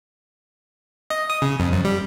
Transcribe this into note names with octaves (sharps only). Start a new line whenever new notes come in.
D#5
D#6
C#3
F2
F#2
G3